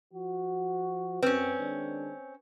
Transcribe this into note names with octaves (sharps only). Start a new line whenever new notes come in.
F3 F#4
F#2 C4 C#4 B4
D#3 G#3 D4